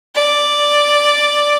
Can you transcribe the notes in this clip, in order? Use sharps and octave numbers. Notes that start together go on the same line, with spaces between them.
D5